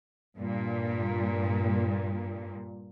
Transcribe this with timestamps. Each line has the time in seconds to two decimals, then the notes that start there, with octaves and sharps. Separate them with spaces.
0.37 G2 A#2